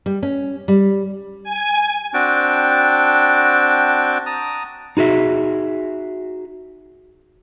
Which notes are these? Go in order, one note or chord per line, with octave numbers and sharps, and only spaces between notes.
G3
C#4
G3
G#5
C4 D4 F#4 G5 A5
A5 A#5 D#6
D#4 F#4 G#4 E5